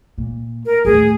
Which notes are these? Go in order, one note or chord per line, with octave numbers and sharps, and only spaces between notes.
A#2
A#4
D#2 A2 G#4